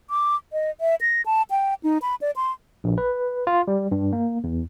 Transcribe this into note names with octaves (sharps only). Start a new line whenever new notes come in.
D6
D#5
E5
A#6
A5
G5
D#4
B5
D5
C6
A#1
B4
F4
G3
G2
A#3
E2